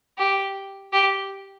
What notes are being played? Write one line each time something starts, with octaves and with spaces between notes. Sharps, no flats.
G4
G4